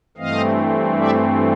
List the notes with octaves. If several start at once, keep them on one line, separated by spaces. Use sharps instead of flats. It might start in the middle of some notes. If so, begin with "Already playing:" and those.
G2 E3 A3 C4 D#5 F5
D5 E5